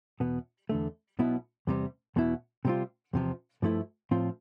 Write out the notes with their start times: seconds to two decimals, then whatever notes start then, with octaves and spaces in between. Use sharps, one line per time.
0.20 E2 B2 B3
0.69 E2 D3 A3
1.19 B1 B2 B3 E4
1.67 E2 C3 G3
2.16 E2 B2 B3 E4
2.65 C3 G3 C4 F4
3.13 E2 C3 F3
3.62 G2 F3 A3 E4
4.11 A2 F3 C4 F4